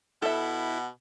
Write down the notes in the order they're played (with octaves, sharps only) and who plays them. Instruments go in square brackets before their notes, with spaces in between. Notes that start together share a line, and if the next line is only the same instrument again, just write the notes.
[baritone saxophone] B2 [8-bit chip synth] E4 [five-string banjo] A4 E5 [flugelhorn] F#5